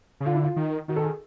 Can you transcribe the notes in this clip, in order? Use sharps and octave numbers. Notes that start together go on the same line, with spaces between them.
C#3
D3 F4
E4
F4
D#3
D#3 F#4
A4
G#4